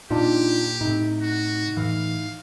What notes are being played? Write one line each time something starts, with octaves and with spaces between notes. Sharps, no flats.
A#2 D4 D#4 F4 G4
A2 C3 D#4
F#4
A2 E3 F5